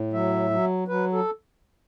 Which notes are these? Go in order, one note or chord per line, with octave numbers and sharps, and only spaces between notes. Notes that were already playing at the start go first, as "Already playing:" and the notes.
Already playing: A2
F#3 E5
F#3
F#3 B4
A4